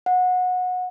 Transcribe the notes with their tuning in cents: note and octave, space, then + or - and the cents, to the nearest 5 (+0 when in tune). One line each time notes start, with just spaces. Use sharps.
F#5 -20